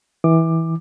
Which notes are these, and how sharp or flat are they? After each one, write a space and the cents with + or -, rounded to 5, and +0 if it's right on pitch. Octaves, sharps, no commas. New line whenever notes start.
E3 -20 D6 +15